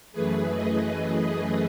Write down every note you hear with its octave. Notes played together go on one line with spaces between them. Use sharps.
F#2 E3 A3 G#4 B4
B4 D#5